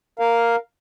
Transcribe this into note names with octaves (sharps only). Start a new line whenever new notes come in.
A#4 F5